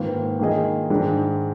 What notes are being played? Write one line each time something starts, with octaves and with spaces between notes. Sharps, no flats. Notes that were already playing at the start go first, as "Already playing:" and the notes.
Already playing: G#2 D#3 A#3 F4 B4
D#3 A#3 F4 G#4 D#5
G#2 D#3 G#3 D4